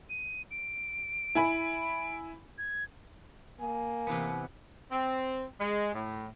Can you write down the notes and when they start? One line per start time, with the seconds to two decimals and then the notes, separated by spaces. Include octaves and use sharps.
0.10 D#7
0.51 D7
1.35 E4 G#5 B5
2.58 G#6
3.60 A#3 G#5
4.07 C3 E3 B3
4.91 C4
5.61 G#3
5.95 A2